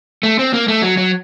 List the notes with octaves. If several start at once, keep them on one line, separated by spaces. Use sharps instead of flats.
A3
C4
A#3
A3
F#3
F#3